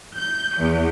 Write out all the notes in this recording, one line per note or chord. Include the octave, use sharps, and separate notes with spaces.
G6
E2